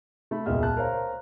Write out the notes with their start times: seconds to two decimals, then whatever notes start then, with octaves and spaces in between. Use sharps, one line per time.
0.31 A3 B5
0.46 E1 C#2 A#2 D#5 E5 F6
0.63 A5 F#6
0.77 A#4 C5 C#5 F5 A#5